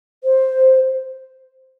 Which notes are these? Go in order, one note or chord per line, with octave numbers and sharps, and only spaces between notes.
C5